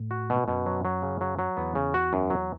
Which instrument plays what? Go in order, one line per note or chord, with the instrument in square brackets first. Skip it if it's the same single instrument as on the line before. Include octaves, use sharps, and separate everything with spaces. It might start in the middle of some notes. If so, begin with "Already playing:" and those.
Already playing: [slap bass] A2
[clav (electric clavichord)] F#4
B2
[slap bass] F#2 [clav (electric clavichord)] B2
[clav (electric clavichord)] F#3
F#3
C#3
F#3
F#3
[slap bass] E2 [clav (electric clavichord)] B3
[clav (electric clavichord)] C#3
F#4
F#2
F#3